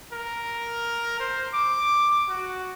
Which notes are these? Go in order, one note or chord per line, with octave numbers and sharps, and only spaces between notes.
A#4
C5
D6
F#4